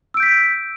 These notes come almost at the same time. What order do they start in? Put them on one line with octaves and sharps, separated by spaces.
E6 D7 G6 B6